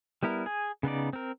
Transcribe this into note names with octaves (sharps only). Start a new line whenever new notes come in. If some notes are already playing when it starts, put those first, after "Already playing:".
G3 B3 E4 A#4
G#4 G#5
C#3 B3 D#4 D5
C4 A#4